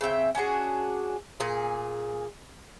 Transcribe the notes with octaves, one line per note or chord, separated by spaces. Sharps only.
C#3 C4 E5 G5
C#4 D4 F#4 G#4
A#2 G#4